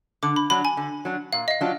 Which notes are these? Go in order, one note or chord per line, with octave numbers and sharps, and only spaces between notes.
D3 D6
B5
F#3 D4 B5
G#5
D3
F#3 D4
A#2 F5
D#5
F5
F#3 D4 F4